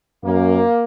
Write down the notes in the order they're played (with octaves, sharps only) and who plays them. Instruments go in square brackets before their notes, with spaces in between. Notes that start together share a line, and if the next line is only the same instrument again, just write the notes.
[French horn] F#2 [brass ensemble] A#3